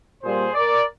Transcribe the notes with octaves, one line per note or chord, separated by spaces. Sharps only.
A#2 G3 A#3 G#4 C5
A#4 D5